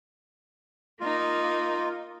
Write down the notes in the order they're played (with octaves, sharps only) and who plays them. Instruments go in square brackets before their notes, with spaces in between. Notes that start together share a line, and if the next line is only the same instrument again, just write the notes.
[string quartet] A#3 D#4 [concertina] F4